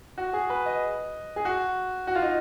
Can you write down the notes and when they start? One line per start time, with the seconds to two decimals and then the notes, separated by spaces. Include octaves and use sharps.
0.18 F#4
0.33 G#4
0.50 B4
0.66 D#5
1.36 G#4
1.45 F#4
2.07 F#4
2.15 F4
2.22 D#4